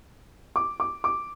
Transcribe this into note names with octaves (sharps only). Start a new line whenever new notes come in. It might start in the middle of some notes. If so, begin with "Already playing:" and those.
D6
D6
D6